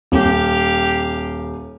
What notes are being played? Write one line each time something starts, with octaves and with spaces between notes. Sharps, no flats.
D#1 G4 F5